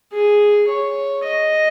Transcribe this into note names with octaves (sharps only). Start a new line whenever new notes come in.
G#4
C#5
D#5